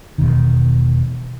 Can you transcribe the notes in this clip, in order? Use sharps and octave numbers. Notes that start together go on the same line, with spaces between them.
E1 A#1 B2 D#3